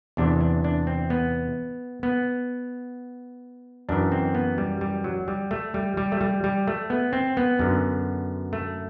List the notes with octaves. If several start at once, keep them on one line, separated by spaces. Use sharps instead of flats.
E2 C3 E3 D4
D4
D4
C4
B3
B3
F#2 E3 D4
C4
B3
G3
G3
F#3
G3
A3
G3
G3
A3
G3
G3
A3
B3
C4
B3
F#2 D3
A3